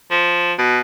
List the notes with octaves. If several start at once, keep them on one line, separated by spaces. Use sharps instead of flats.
F3
B2